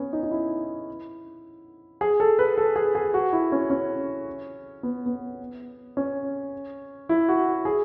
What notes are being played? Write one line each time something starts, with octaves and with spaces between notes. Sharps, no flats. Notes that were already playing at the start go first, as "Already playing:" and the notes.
Already playing: B3 C#4
D#4
D#4
E4
G#4
A4
B4
A4
G#4
G#4
F#4
E4
C#4
C#4
B3
B3
C#4
E4
F#4
G#4